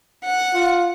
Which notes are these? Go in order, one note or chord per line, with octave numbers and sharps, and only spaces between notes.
F#5
F4